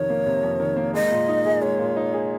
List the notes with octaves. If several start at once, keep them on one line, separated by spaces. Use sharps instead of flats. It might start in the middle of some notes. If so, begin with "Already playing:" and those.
Already playing: F2 C3 D#3 C#5
A#3
C3
F2
D#3
A#3
G#3 D#5
A#2
D#4
G#4
G#3 C#5
A#2
D#4
G#4